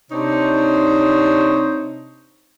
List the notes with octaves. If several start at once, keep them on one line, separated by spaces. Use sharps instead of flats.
C3 C4 D4 D#4 C5 C#5